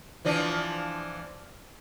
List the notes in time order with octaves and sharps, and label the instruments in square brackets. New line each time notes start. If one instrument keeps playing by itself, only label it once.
[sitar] E3 F3 D4